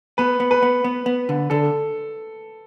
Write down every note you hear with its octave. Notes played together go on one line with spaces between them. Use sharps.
B3 B4
B3
B4
B3
B3
B3
D3
D3 A4